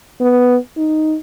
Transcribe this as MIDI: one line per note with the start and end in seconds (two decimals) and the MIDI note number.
0.21 0.56 59
0.77 1.17 63